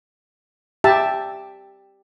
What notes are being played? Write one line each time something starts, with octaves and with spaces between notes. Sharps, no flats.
G4 E5 A5